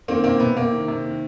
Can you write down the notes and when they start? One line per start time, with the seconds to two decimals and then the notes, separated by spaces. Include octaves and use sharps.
0.08 D#3 A#3 C4
0.24 C3 A#3 C4
0.40 C3 B3
0.57 C3 A#3
0.72 D#3
0.88 C3
1.04 D#3